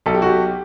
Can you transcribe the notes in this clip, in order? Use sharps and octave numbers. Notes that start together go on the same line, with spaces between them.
B1 A4
G4
B1 F#4
G4